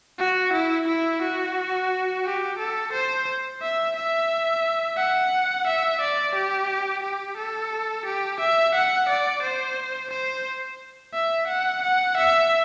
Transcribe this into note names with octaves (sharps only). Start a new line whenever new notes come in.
F#4
E4
E4
F#4
G4
A4
C5
E5
E5
F#5
E5
D5
G4
G4
A4
G4
E5
F#5
D5
C5
C5
E5
F#5
F#5
E5